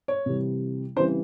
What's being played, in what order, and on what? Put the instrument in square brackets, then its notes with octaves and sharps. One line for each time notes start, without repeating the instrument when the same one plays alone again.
[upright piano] C#5
[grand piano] C3 E3 G3
[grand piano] C#3 E3 G3 C4 [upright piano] C5